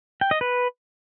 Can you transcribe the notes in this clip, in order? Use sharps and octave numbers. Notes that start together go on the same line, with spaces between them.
G5
D#5
B4